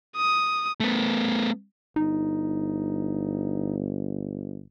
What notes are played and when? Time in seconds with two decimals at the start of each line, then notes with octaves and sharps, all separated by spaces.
0.17 D#6
0.80 A3 B3
1.96 G1 D#4